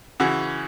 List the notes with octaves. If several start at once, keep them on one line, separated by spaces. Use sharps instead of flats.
C#3 E3 F#4